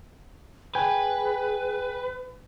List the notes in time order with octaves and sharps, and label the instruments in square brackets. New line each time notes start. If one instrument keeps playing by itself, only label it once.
[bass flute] G#4 [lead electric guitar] B4 [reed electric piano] G5 G#5